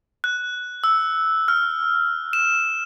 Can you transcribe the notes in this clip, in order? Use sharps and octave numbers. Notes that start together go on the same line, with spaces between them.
F#6
E6
F6
E7